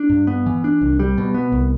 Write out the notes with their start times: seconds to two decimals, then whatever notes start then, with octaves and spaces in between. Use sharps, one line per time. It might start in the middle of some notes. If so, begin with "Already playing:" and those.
Already playing: D4
0.10 G2
0.27 B3
0.46 E3
0.64 D4
0.82 C2
0.99 G3
1.18 B2
1.34 B3
1.52 C2